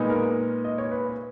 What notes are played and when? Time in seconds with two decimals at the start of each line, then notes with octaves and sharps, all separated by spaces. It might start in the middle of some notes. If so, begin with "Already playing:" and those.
Already playing: A#2 G#3 B3 D#4
0.09 A#4
0.64 D#5
0.78 C#5
0.92 B4
1.09 B4